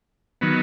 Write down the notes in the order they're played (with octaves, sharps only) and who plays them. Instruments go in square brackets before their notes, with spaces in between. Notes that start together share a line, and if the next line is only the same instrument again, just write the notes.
[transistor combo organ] D#3 F#3 B3